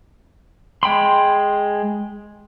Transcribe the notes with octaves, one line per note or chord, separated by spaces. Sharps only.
G#3 G5 B5 C6